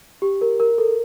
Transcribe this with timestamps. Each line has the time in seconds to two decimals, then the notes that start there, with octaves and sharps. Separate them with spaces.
0.22 G4
0.41 A#4
0.60 A#4
0.78 A4